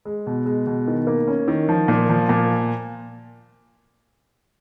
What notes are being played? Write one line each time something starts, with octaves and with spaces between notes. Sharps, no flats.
G#3
B2
G#3
B2
D#3
A#3
C#4
D#3
F3
A#2
F3
A#2